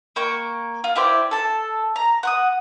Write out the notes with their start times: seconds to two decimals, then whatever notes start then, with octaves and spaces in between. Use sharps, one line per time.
0.16 A#3 G5 C#6
0.84 F4
0.96 E4 G4 C5 D5
1.31 A4 A5
1.96 A#5
2.23 F#5 C#6 D#6